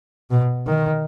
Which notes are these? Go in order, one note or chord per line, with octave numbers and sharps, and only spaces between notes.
B2
D#3